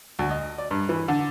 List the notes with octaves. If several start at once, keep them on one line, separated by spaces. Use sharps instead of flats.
D2
D#5
D5
G2
E3
D3